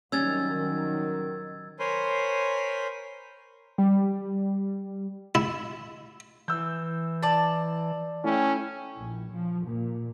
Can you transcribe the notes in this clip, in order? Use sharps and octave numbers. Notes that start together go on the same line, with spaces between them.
D#3 F#3 G3 C#4 E6 G#6 A6
A#4 C5 C#5 G#5 B5 C6
G3
E4
E3 E6 G6
D5 A5
A3 C#4 E4 G5
A#1
F3
A#2